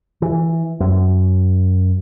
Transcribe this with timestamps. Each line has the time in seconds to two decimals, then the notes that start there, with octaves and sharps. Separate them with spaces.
0.22 E3
0.80 F#2